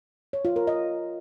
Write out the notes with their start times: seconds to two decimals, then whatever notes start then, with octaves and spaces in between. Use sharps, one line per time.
0.33 C#5
0.45 F4
0.56 A#4
0.67 D#5